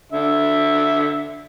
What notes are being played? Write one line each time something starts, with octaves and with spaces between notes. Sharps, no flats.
D3 E5